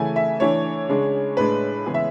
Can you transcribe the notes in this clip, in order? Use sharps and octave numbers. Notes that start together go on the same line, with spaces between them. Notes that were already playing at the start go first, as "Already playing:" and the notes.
Already playing: C#3 E3 A3 C#4 G#5
E5
E3 A3 D4 C#5
C#3 G#3 D4
A2 G#3 D4 B4
C#3 E3 G#3 B3 G#4
E5